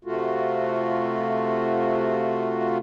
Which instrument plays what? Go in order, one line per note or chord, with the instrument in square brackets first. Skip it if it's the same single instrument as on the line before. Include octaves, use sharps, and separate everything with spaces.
[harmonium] C3 A3 F4 F#4